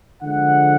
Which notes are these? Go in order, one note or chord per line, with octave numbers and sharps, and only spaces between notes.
D3 F3 G#3 F#5